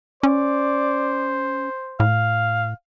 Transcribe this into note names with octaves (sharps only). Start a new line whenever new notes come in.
C#4 C5 D5
A2 F5